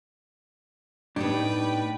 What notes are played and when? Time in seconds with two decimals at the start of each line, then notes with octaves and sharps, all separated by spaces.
1.16 A2 B3 D4 D#4 G4 B4 G5